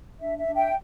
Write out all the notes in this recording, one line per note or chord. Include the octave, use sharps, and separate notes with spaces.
D4 E5
E5
D4
E5 G5